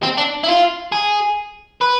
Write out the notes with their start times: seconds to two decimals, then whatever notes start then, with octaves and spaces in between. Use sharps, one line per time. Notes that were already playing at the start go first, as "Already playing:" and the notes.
0.03 C4
0.17 D4
0.43 E4
0.47 F4
0.92 G#4
1.82 B4